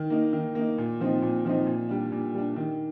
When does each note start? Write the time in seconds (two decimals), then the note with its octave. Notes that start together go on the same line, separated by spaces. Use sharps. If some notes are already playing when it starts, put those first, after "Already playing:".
Already playing: D#3
0.10 A#3 D#4
0.33 D#3
0.55 A#3 D#4
0.78 A#2
1.00 F3 C4 D#4
1.22 A#2
1.45 F3 C4 D#4
1.67 A#2
1.89 G3 D4
2.12 A#2
2.34 G3 D4
2.56 D#3